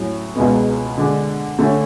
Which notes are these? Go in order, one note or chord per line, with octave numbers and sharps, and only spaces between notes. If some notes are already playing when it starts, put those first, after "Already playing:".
Already playing: A2 F#3 C#4
C#2 B2 G#3 B3
D3 G#3 D4
D3 A3 C#4